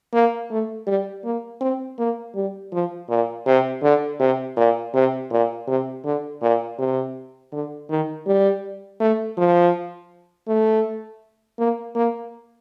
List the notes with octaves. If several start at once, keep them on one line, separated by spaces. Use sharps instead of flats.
A#3
A3
G3
A#3
C4
A#3
G3
F3
A#2
C3
D3
C3
A#2
C3
A#2
C3
D3
A#2
C3
D3
D#3
G3
A3
F3
A3
A#3
A#3